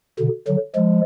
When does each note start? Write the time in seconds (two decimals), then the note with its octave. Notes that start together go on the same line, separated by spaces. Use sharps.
0.19 B2 D3
0.47 D3 F#3
0.75 F3 G#3